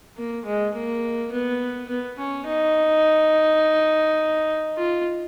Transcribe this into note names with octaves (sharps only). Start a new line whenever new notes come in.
A#3
G#3
A#3
B3
B3
C#4
D#4
F4